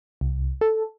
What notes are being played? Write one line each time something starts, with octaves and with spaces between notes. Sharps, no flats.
C2
A4